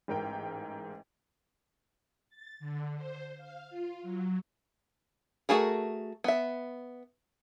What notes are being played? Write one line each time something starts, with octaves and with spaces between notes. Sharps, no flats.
A1 G#2 A#4 G5
A6
D3
C5
F5
F4
F#3
A3 F#4 G#4 A#4
B3 E5